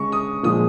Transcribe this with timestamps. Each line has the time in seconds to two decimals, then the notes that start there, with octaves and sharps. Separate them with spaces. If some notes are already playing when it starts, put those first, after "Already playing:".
Already playing: C#3 G#3 C#6
0.12 D#6
0.43 A#2 F3 G#3 D#6